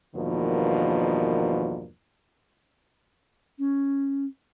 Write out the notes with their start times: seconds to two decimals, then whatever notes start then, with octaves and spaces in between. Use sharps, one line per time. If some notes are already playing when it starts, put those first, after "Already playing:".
0.16 E2 G2 B2 D#3 F3 A#3
3.58 C#4